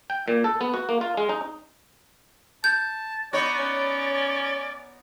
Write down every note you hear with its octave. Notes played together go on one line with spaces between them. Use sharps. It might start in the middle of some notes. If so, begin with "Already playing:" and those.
G5
A#2
A4
B3
F#4
A#3
F4
G#3
D#4
A5 G6
B3 D#4 C#5 D5
C#4